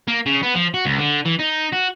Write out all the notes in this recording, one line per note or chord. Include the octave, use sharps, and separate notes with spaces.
A#3
C#3
B3
F3
F#4
C#2
D3
E3
D#4
F#4